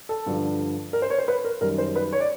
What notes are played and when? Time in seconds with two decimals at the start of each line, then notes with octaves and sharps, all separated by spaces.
0.09 A4
0.26 G2 D3 F3
0.93 A#4
1.02 C5
1.10 C#5
1.18 C5
1.28 B4
1.45 A#4
1.61 F#2 D#3 G3 A#4
1.78 C5
1.96 B4
2.13 C#5
2.20 D5